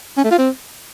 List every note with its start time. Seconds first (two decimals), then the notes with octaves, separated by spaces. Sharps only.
0.17 C#4
0.24 A3
0.31 F4
0.38 C4